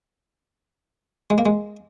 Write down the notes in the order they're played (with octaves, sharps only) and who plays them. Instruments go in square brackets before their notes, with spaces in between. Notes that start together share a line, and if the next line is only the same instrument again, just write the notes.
[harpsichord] G#3
A#3
G#3